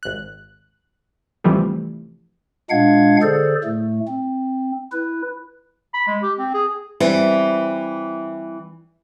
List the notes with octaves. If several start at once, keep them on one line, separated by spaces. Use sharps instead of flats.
G#1 F#6
A1 C3 E3 F3 G3 A3
A#2 G#3 D4 F5 F#5 G#6
D3 G#4 A4 C5 D5
A2 A3
C4
E4 B4
B5
G#3
G4
C4
G#4
E3 G3 C4